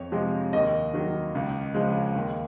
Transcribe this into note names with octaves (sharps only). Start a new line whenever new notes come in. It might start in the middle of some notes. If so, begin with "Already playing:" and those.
Already playing: F2 C#5
C3 F3 G#3
D#2 D#5
D#3 F#3
C#2
C#3 F3 G#3
D#2